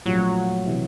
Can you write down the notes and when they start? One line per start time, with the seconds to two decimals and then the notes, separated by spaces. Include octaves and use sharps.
0.05 A#2 F3 F#3 A3 C#4 F#4
0.65 C3 E3